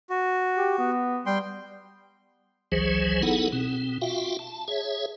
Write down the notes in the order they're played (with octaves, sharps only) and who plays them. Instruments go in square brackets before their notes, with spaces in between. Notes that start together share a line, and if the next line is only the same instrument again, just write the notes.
[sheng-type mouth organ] F#4
[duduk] G4
B3
[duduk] G3 [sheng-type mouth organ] G5 C6
[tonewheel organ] G#1 C#2 E3 F#3 G#4 C5
B3 D#4 E4 G#4 A4 F#5
B2 C4
F4 F#4 E5 F5 G5
A5
G#4 C#5 E5